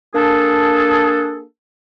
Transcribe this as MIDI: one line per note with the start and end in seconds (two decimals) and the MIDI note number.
0.14 1.44 58
0.14 1.44 62
0.14 1.44 68
0.14 1.44 69